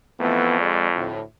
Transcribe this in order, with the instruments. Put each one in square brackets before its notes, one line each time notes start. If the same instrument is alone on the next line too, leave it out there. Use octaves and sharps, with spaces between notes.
[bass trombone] F2 [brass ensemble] E3 A3 B3
[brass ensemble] G#3 D5
D2 A2